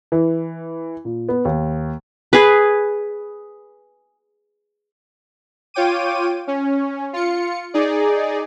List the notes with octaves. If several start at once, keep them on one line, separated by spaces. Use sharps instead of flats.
E3
A#2
B3
D#2
G#4 B4
F4 C#5 G5 D6 D#7
C#4
F4 C#7
D#4 G#4 D5